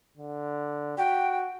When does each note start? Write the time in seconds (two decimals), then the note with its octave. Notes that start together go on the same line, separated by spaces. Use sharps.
0.17 D3
0.98 F#4 G5